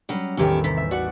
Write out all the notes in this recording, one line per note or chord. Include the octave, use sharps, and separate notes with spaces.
F#3 G3 C#4
A1 E2 D#3 C#4 G4 E5
C3 B6
E5
F#4 D5 F#5